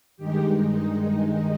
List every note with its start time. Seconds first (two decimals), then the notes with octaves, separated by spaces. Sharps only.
0.17 G2 D#3 G#3 D#4 G4